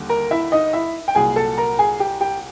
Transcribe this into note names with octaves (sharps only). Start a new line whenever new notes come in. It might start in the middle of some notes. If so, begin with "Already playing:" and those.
Already playing: D#2 D3 G3
A#4 A#5
E4 E5
D#4 D#5
E4 E5
G5
C2 A#2 F#3 G#4 G#5
A4 A5
A#4 A#5
G#4 G#5
G4 G5
G4 G5